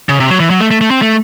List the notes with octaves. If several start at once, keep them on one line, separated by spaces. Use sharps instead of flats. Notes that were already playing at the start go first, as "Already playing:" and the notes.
C#3
C3
F#3
E3
F#3
A3
A3
A3
C4
A3